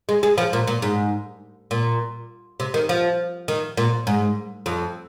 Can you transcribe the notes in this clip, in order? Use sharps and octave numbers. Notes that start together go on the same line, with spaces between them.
G#3
G#3
F3
A#2
A#2
G#2
A#2
C3
D#3
F3
D#3
A#2
G#2
F2